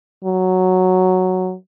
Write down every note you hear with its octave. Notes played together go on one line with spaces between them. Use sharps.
F#3